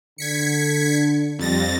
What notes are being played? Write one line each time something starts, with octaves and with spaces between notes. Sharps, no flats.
D3 G#6 B6 C#7
F2 G3 A6 A#6